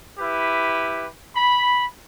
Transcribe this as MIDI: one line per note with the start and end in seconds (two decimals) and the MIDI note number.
0.19 1.06 64
0.19 1.06 67
0.19 1.06 71
1.35 1.84 83